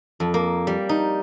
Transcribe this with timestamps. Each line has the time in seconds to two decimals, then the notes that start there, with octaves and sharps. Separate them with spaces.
0.20 F2
0.34 A#3
0.67 G3
0.89 D#4